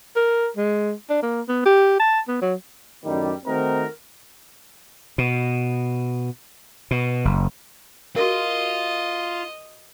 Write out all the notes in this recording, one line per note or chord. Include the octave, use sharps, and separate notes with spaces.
A#4
G#3
D4
A#3
B3
G4
A5
B3
F#3
F#2 A2 D#3 G3
D#3 A3 C4 D#4 F#4 A#4
B2
B2
F#1
F4 F#4 G#4 A#4 D#5